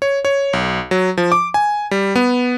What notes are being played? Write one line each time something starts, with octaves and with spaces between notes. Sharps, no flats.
C#5
C#5
B1
F#3
F3
D6
G#5
G3
B3